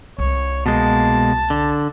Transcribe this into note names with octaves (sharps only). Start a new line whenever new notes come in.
C2 C#5
B2 G#3 A#3 A5
D3